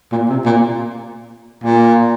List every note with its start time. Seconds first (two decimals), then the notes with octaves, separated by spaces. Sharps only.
0.12 A#2
0.30 C3
0.46 A#2
1.64 A#2